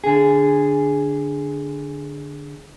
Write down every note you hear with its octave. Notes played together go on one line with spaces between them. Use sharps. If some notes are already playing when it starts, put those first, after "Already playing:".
D3 G#4